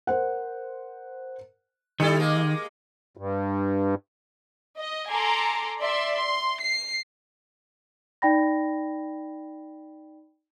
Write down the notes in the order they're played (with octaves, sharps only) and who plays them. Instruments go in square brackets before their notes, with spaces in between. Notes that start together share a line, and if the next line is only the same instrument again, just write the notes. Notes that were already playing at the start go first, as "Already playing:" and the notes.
[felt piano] A#4 C5 F#5
[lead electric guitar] D#3 [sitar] G3 E4 A4 [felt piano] C#7
[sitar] G#3 A#3
[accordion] G2
[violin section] D#5
A4 G#5 A#5 C6 D6
D5 E5 C6
C6
C7
[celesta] D#4 D5 G5 B5 A#6